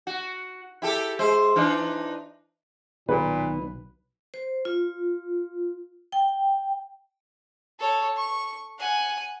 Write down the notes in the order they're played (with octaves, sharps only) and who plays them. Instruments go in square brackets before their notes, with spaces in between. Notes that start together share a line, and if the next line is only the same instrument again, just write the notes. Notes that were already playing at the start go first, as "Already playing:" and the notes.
[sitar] F#4
E4 G4 A4
G#3 C5
E3 D4 D#4
[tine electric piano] B1 [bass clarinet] A#2 [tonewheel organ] D#3 B3 [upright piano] B4
[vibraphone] C5
F4
G5
[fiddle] A4 C#5
C#6
F#5 G#5